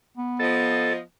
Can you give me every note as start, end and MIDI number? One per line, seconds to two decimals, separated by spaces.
0.17 1.01 59
0.40 0.99 53
0.40 0.93 69
0.40 0.99 75